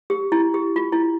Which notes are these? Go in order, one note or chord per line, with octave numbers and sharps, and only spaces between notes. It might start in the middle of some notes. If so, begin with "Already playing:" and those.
G4
E4
G4
F4
E4